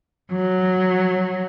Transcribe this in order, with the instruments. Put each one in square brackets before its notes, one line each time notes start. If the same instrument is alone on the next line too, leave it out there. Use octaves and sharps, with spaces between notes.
[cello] F#3